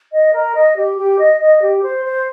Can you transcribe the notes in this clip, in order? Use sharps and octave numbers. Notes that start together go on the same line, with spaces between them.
D#5
A#4
D#5
G4
G4
D#5
D#5
G4
C5
C5